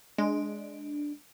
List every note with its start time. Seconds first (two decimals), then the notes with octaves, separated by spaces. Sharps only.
0.18 G#3 D4